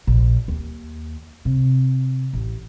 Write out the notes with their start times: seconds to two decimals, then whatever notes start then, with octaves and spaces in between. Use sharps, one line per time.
0.07 A#1
0.48 D#2
1.45 C3
2.33 A1